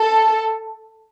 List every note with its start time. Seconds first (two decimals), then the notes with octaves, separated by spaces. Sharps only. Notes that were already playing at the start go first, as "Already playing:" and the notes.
Already playing: A4